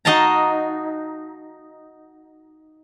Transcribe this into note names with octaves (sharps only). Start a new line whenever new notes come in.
D#4 F#4 D#5 F5 A5 A#5